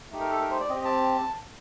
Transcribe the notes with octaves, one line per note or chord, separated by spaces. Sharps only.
A3 D#4 G4
A#4
A4
A#4
C5
D5
C4 D#5
G4
A5